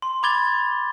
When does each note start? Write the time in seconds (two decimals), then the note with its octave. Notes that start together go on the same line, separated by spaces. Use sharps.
0.02 C6
0.23 B5 D6 G#6 A6 G7